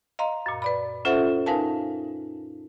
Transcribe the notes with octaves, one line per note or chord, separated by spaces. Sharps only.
D#5 F5 A#5 C6
F#2 A#2
B4 D5 B5
C#4 F4 A4 C5 E5 F#5
D#4 A#4 B4 F5 G#5 A5